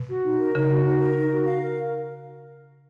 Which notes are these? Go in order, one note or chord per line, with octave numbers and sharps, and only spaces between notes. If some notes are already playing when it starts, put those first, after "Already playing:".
Already playing: B2
F#4
D#4
A#4
C#3 D#4
F#4
D#4
A#4
D#4
F#4
F5
A#4